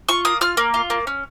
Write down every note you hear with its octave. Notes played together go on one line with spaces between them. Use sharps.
F4 C#6
A#3 D#6
F4 F6
A#3
F4
A#3
C#4